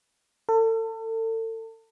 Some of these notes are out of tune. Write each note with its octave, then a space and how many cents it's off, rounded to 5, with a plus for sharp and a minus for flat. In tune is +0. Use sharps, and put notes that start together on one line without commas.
A4 +35